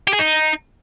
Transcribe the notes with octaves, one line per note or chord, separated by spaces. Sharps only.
G4
G#4
D#4